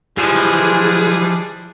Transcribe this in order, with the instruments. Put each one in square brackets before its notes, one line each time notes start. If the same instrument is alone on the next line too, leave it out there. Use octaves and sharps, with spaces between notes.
[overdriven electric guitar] E3 F3 [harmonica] G3 G#3 D4 [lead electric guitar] G#4